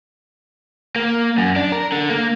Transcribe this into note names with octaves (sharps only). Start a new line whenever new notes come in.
A#3
F#2
D4
A#4
D3
A#3